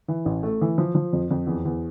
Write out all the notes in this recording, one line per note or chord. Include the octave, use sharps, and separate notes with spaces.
E3
A1
A3
E3
F3
F3
F2
F2
E2
E2